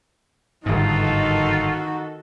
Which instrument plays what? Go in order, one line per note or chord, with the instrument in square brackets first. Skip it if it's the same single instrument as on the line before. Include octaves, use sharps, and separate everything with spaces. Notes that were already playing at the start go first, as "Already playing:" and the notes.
[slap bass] G1 G#2 [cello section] D#3 A4 [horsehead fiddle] D#4 F#4 [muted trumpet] F4